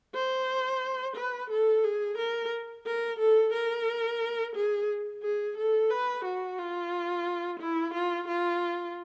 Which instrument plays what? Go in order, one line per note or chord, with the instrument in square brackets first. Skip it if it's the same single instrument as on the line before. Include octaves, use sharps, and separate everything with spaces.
[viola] C5
B4
A4
G#4
A#4
A#4
A4
A#4
G#4
G#4
A4
B4
F#4
F4
E4
F4
F4